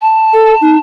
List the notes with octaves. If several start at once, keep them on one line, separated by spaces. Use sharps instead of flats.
A5
A4
D#4